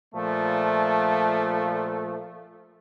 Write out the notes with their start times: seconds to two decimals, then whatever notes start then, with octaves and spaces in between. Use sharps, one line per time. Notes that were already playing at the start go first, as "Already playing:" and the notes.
0.13 A#2 F3 A3